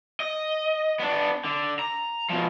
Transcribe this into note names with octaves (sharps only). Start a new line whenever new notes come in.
D#5
B3 D4
D3
A#5
B2 F3